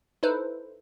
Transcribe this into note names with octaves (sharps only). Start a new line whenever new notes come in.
D#4 E4 A4 B4 C5